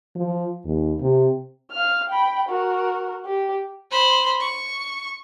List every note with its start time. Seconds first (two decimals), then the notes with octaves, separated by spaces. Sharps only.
0.15 F3
0.65 D#2
1.00 C3
1.72 F5 F6
2.09 G5 B5
2.48 F#4 A#4
3.25 G4
3.90 C5 B5
4.40 C#6